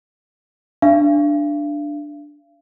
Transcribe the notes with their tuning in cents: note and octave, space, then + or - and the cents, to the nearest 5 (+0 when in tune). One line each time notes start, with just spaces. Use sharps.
D4 +0 F5 -40